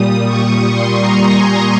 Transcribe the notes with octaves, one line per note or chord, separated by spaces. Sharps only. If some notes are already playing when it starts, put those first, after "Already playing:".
Already playing: A#2 G3 D#6
C#6
C6
A#5
G#5